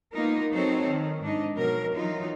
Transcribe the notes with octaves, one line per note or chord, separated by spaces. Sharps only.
A#3 B3 D#4 F4 A#4
F#3 C4 D#4 A4 C5 C#5
D#3
G#2 D4 D#4 D#5
B2 F#3 A#4
E3 F#3 D#4 F4